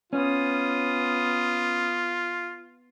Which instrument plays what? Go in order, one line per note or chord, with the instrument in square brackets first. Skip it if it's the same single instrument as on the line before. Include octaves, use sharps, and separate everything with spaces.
[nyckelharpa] B3 D#6 [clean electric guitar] C#4 [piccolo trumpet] F4